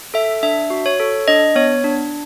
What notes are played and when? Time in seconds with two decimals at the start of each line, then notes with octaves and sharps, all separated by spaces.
0.14 A4 E5
0.43 D4 E5
0.70 F#4
0.86 C#5
1.00 A4
1.28 D4 D#5
1.55 B3 C#5
1.84 D4